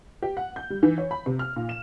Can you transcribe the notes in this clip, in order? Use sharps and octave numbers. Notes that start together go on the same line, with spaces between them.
G4
F#5
G6
G3
E3
C#5
B5
C3
F6
A#2
E7